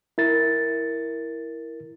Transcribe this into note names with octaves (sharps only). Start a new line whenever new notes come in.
E4 A#4 A6